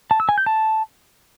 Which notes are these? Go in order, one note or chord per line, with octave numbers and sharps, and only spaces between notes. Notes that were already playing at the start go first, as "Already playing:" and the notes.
A5
E6
G#5
G6
A5